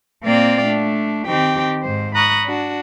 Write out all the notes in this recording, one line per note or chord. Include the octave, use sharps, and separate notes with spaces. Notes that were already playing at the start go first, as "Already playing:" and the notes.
A#2 A#3 C4 D5 F5 G5
A3 D4
D#3 C4 G4 G5
G#2 C5
A#5 B5 C#6 D#6 F#6
D4 F#4